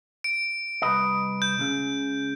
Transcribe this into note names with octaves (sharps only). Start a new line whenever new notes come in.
D7
C2 B4 D#5
G6
C#2 C#3